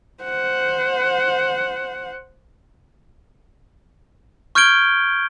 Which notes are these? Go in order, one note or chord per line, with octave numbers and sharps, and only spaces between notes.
C5 F#5
C#6 F6 G6 G#6 D7 G7